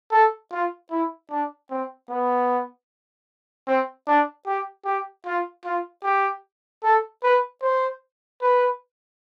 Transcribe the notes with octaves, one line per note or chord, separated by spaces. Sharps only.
A4
F4
E4
D4
C4
B3
C4
D4
G4
G4
F4
F4
G4
A4
B4
C5
B4